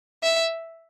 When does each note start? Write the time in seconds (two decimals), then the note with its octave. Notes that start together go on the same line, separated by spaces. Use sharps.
0.23 E5